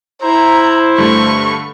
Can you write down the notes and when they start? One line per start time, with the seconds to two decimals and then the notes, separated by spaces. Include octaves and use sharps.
0.22 E4 C5 A#5
0.98 G2 D3 A3 C#6